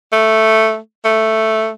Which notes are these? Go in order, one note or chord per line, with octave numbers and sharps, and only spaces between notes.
A3
A3